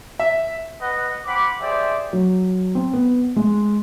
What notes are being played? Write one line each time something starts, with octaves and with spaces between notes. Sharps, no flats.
E5
B4 D#5 F#5
C4 F#5 B5 D6
G4 G#4 C5 D5 E5
F#3
C4
B3
G#3